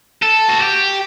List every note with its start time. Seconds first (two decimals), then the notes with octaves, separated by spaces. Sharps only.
0.22 A4
0.48 F#4
0.60 G4